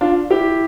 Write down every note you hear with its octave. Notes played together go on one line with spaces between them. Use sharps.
D4 F4
E4 G4